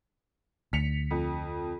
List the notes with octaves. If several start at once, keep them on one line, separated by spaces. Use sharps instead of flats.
D2 B6 C#7 F7
F2